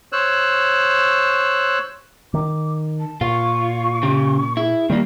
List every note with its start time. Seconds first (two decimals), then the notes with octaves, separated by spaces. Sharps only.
0.12 C5 C#5 E6 F#6
2.34 D#3 D6
3.00 A5
3.21 A#2 F4 C#6
4.03 C#3 G4
4.57 E4 G#4
4.90 D#3 G3 A#3 D5